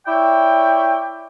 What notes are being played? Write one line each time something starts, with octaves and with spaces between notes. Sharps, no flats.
E4 C#5 D5 G5